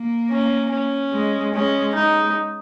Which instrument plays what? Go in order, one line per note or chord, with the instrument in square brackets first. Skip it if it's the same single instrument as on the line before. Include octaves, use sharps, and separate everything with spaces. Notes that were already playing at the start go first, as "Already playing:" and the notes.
Already playing: [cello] A#3
[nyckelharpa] C#4
C#4
[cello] G#3
[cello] G#3 [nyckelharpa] C#4
[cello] G#3 [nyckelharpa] D#4